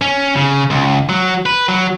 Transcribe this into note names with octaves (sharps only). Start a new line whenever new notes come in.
C#4
C#3
C#2
F#3
B4
F#3